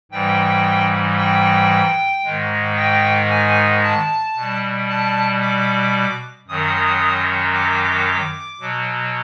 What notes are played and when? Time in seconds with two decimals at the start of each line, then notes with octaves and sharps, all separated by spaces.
0.12 G#2 E3 G3 G5
1.18 G5
2.24 G#2 D#3 G#3
2.77 G5
3.30 G#5
3.83 A5
4.36 B2 G3
4.89 A5
5.42 D6
6.48 F#2 D#3 F#3 D#6
7.54 D6
8.60 B2 F#3